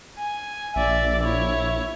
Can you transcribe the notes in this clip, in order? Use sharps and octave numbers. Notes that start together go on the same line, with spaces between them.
G#5
A#1 D5 E5
E4 C#5